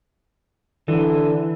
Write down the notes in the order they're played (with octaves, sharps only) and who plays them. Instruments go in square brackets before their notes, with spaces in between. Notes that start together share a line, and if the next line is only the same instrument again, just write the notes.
[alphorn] D3 [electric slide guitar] E3